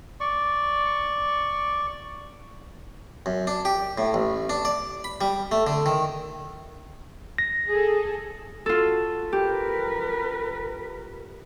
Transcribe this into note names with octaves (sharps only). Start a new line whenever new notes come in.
D5 C#6
F#2
D4
G4
A2
A1
D4
D5
B5
G3
A3
D3
D#3
A#6
G#4 A4
F4 F#4 A4
G4 A#4 B4